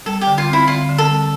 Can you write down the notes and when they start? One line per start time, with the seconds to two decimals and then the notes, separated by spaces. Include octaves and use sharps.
0.06 G3 A4
0.21 G4
0.27 D3
0.38 F4
0.48 C4
0.53 E4
0.68 D3 F4
0.89 D3
0.98 A4
1.09 G3